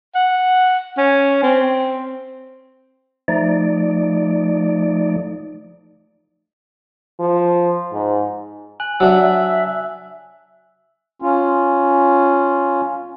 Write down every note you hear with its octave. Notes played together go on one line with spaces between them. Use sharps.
F#5
C#4
C4
F3 A3 D#4 D5
F3
G#2
G#5 F#6 F#7
F#3 D4 E5 E6
C#4 F4